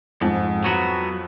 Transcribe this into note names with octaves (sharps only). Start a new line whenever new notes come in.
F2 G#2
F#3 B3 F#4